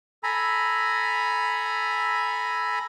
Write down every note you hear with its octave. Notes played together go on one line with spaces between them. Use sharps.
A4 G#5 A#5 B5